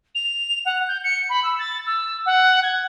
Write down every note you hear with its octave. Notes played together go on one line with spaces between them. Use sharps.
F7
F#5
G6
C#7
B5
E6
A6
E6
F#5
G#6